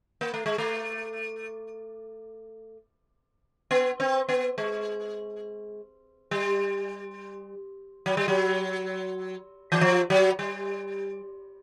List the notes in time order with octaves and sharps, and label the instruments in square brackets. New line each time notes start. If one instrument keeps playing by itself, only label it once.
[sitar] A#3
A3
G#3
A3
B3
C4
B3
G#3
G3
F#3
G3
F#3
E3
F3
F#3
G3